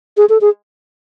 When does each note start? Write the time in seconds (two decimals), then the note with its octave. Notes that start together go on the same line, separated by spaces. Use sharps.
0.17 G#4
0.29 A4
0.41 G#4